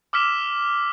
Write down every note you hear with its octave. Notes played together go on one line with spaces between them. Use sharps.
D6 E6 F6 B6 E7